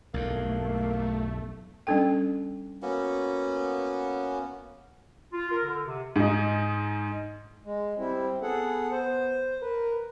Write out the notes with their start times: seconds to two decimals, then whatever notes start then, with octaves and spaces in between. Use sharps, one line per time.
0.14 B1 E2 G2 A3 A#3
1.87 G3 C#4 D4 A4 G5
2.82 A#3 B3 C#4 F#4
5.33 F4
5.52 A#4
5.64 D3
5.87 C3
6.16 G#2 D#4
7.65 G#3
7.98 G3 C4 E4
8.42 B3 G#4 A4 F#5
8.92 C5
9.62 A#4 B4